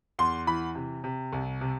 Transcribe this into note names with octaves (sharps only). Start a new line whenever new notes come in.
E2 C6
E3 B5
C3
C3
C2
C3